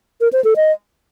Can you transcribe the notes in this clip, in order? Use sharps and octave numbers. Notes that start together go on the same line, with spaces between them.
A#4
C5
A4
D#5